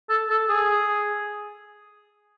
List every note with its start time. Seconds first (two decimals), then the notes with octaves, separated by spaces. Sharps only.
0.10 A4
0.30 A4
0.49 G#4